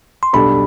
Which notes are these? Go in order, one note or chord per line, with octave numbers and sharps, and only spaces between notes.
C6
B1 B2 G3 D4 A4 B5